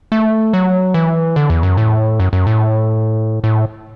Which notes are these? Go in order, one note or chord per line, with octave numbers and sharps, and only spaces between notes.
A3
F#3
E3
D3
E2
F#2
A2
F#2
F#2
A2
A2